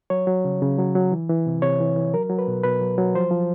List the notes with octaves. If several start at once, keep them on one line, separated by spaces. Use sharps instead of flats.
F#3 C#5
F#3
C#3
C#3
F#3
F#3
E3
E3
C3
C3 C#5
E3
E3
F#3 A#4
F#3
B4
B2
B2 B4
F#3
F#3
F3 C5
F3